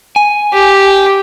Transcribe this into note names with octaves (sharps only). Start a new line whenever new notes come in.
G#5
G4